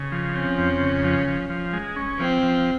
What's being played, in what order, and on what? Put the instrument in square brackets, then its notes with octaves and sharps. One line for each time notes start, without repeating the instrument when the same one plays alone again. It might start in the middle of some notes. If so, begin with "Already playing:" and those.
Already playing: [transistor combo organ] C#3
F3
[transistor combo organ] C4 [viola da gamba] C#4
[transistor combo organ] F2
C#3
F3
F3
F3
G#3
C#4
[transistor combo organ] F3 [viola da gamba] C4
[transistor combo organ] F3